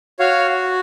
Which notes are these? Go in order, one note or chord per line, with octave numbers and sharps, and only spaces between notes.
F#4 C#5 F5